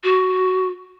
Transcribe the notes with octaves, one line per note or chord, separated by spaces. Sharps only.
F#4